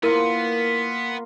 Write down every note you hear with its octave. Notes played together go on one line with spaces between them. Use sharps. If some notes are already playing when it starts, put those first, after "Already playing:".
A#3 B3 E4 F4 A#4 D#7